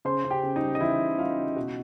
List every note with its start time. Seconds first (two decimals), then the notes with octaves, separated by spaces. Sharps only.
0.05 C#3 C5 C6
0.24 C#3
0.30 G4 G5
0.43 C#3
0.56 D#4 D#5
0.62 G3
0.75 D#5
0.80 E3 E4 E5
1.00 C#3
1.18 G3 F4 F5
1.38 C#3
1.56 B2 F#4 F#5